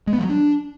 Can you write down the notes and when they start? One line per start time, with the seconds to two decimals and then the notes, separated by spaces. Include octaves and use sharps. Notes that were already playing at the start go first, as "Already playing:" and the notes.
0.07 G#3
0.13 B3
0.18 F3
0.24 F#3
0.29 D4